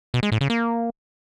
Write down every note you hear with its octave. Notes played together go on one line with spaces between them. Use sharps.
B2
G#3
A2
C#3
A#3